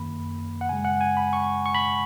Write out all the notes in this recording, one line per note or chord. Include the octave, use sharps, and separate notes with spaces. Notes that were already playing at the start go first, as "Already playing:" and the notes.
Already playing: F#2 D#3 A#3 B5
F#5
F#2 C#3 G#3 G#5
F#5
G#5
B5
C#6
C#6
B5